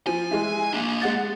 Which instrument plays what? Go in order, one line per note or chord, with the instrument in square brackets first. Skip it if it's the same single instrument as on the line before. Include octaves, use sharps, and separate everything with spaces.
[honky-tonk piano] F3 [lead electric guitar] G#5
[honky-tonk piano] E3 G#3
[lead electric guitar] A#3 D4
[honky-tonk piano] G#3 F#5 A6